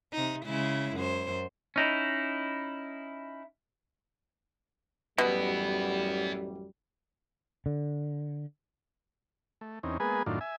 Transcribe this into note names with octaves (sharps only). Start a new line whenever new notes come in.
C3 D#4
C#3 G#3 E4
F#2 C5
C#4 D#4 E4
A1 F#2 B2 G3 B3 E4
D3
A3
E2 C4 C#4 D#4
G#3 A#3 B3 G#4 B4 G#5
F#2 A2 D#3 D4 F4
E5 G#5